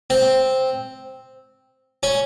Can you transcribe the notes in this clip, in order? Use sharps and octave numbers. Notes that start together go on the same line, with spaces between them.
C4
C#4